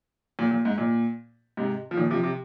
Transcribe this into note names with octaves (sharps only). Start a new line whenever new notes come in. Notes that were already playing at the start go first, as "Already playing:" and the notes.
A#2
A#2
G#2
A#2
G#2 C3
F3
A#2 D#3
C3 F3
C3